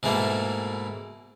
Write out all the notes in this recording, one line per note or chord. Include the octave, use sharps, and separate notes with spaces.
G#2 B2 E3 A3 A#3